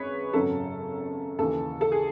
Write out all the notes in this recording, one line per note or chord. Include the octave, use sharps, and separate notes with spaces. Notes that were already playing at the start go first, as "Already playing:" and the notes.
Already playing: G#1 F#2 G#4 B4 C#5
G#1 F#2 C#3 F#3 A4
D#2 C#3 E3 A4
A4
G#4